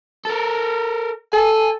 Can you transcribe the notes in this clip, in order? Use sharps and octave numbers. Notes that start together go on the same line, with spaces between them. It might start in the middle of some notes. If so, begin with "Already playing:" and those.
A4 A#4
A4 G#5